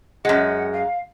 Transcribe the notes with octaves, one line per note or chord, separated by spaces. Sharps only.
F#2 G#3 F#5
F5